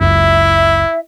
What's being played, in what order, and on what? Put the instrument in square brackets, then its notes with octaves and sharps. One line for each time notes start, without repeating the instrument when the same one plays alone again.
[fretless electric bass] F#1 C#2 F#2 [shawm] E4 [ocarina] E5